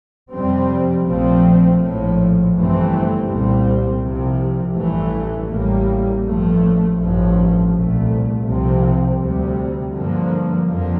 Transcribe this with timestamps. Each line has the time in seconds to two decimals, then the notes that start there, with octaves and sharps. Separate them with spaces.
0.31 F2 C3 G3 C4
1.05 A#1 A#2 F3 A3 C4
1.80 A#1 A2 F3
2.54 G1 G2 E3 A3 C4
3.27 C2 A#2 G3 C4
4.01 C2 C3 F3
4.76 A1 G2 E3 A3
5.50 A1 A2 G3 A#3
6.24 A1 G2 F3 A3
6.98 A1 G2 F3 A3
7.72 C2 A#2 A3
8.46 C2 C3 F3 C4
9.20 D2 C3 G3
9.94 G2 D3 F3 A#3
10.68 F2 D3 F3 A#3